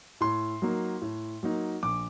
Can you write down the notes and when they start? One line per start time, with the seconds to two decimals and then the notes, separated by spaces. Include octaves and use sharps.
0.21 A2 C6
0.62 F#3 A#3 D#4
1.02 A2
1.43 F#3 A#3 D#4
1.83 A#1 D6